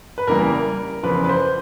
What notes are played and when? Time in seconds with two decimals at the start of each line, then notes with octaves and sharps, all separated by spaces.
0.18 B4
0.27 E2 C#3 E3 G3 A#3 A#4
1.03 E2 C#3 F3 B4
1.24 B4
1.29 C5